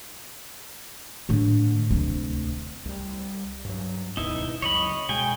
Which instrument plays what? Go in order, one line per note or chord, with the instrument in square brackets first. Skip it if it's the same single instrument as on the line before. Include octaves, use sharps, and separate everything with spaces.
[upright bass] A2 D3
D2 C3
[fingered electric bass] C2 G3
G2 F#3
[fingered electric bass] D#1 C#2 B2 [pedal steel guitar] D#4 E4
[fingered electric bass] C#2 F#2 [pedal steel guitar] C#5 D#5 B5
[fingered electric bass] B2 G#3 [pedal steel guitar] G5 G#5